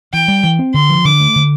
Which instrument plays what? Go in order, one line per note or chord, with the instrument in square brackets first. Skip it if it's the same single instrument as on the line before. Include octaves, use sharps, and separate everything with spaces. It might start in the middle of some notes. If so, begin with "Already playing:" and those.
[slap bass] E3 [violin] G5
[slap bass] G3
E3
C4
[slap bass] D3 [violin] C6
[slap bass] F3
[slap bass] D3 [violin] D6
[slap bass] A3
D3